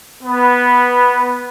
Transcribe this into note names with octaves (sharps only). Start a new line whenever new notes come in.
B3